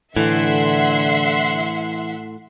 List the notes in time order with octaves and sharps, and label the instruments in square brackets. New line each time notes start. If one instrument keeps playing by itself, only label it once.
[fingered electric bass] A2 [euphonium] D3 [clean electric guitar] E3 [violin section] E5 F#5 C6